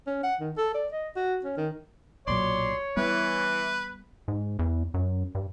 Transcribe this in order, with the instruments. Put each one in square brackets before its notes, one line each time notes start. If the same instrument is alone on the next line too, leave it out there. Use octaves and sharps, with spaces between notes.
[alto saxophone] C#4
F#5
D#3
A4
D5
D#5
F#4
C#4
D#3
[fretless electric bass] B1 A#2 F#3 [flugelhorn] C#5 [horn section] D5 C6
[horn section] E3 [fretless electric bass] G3 B3 [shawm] B4
[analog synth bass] G#2
E2
F#2
G2